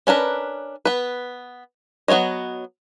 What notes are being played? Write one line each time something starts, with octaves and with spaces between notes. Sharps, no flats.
C#4 D4 A#4 B4
B3 B4
F#3 B3 C4 C#5 D#5